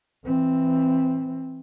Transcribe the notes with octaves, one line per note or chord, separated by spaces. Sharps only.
E3 C4